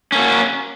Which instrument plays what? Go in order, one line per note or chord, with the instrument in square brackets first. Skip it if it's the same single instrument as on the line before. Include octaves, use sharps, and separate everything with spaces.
[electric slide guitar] C#4
A#3
F#4